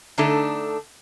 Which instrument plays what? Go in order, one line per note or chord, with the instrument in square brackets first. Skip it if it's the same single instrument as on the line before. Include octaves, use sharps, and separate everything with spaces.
[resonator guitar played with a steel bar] D3 A3 D4 D#4 A4